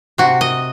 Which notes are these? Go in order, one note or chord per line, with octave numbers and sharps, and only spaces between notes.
C3 F#4
D#5